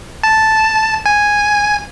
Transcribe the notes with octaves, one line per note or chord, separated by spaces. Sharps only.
A5
G#5